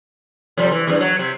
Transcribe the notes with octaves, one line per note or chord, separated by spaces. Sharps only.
F2 C3 G3
E3
E2 G2
F#3
C3